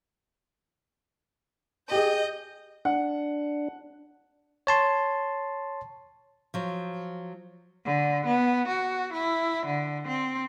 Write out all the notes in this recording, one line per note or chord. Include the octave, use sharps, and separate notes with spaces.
G4 G#4 D#5 G6
D4 F#5
C#5 A5 C6
F3 F#3
D3
B3
F#4
E4
D3
C4